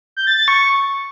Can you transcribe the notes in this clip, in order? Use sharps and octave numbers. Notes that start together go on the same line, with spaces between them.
G6
A6
A6
C#6